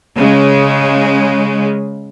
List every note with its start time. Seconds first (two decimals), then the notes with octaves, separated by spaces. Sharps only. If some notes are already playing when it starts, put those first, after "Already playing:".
0.15 C#3 G#3